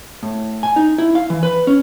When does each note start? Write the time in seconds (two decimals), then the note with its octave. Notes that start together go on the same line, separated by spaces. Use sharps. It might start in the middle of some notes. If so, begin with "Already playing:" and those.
0.23 A2
0.63 G#5
0.76 D#4
0.98 E4
1.15 F5
1.30 E3
1.43 B4
1.67 C#4